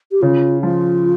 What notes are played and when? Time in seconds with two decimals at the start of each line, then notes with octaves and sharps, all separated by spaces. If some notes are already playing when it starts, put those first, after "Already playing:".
0.12 G4
0.22 C#3 F4
0.63 F3 F4